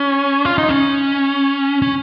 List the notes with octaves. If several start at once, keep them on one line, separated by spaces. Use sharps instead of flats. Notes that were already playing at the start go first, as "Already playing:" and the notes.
Already playing: C#4
F4
D#4
C#4
C#4